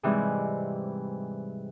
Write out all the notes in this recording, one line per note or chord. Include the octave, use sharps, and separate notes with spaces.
G#2 C3 E3 G3 G#3